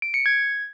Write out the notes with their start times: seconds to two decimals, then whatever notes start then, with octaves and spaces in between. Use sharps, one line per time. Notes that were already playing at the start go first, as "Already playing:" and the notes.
0.02 D7
0.14 C#7
0.26 G#6